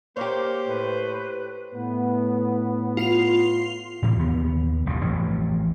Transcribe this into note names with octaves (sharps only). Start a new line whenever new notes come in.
A#3 G4 C5 C#5
A2 B4
A2 B3
F4 C7 F7
A2 C3 E3
D#2 B3
F1 E2 G2 B2
A1 F2